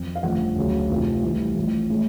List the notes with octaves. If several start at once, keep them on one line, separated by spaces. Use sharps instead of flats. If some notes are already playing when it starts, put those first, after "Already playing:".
Already playing: F2
F5
G1 F2 C#3 F3 A3 F#5
D2 C#3 F#3
F1 F2 C3 F3 A3
C2 C3 E3 A3
A1 A2 F3 A3
A2 E3 G#3